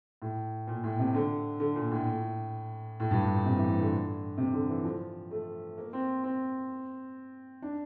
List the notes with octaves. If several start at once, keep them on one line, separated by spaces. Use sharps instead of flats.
A2
A#2
A2
C3
D3
D3
A#2
A2
A2
G2
A2
A#2
C3
E3
E3
D3
C3
D3
E3
F3
A3
A#3
C4
C4
D4